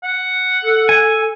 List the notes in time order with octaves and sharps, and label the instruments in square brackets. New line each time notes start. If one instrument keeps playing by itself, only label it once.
[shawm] F#5
[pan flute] A4
[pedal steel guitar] G#5